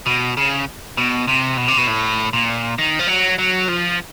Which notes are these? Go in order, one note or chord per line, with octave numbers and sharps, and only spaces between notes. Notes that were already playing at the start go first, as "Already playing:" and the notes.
B2
C#3
B2
C3
B2
C3
B2
A2
A#2
D#3
F3
F#3
F#3
F3